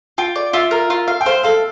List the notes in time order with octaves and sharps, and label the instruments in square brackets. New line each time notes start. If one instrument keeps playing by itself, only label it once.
[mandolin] F4 [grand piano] G5
[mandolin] D5
[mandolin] F4 [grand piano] E5
[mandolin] A#4
F4
F5
[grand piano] G5
[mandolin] C5 [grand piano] F5
[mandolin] A4 [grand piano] F5